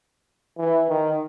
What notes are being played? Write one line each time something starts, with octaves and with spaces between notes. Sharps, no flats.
E3
D#3